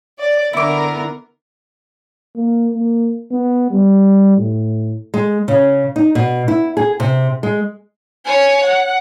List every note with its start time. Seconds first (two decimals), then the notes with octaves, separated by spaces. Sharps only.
0.20 D5
0.53 D3 B3 E4 A#4 D6
2.36 A#3
2.74 A#3
3.31 B3
3.71 G3
4.37 A2
5.14 G#3
5.48 C#3
5.96 D#4
6.15 B2
6.48 E4
6.77 G#4
7.00 C3
7.43 G#3
8.25 C#5 G#5
8.64 F#5